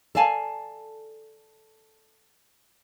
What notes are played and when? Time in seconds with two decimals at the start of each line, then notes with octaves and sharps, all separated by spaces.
0.15 A4 D5 F5 G#5 A5